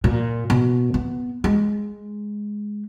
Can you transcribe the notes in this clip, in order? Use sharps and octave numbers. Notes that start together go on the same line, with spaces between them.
A#2
B2
B3
G#3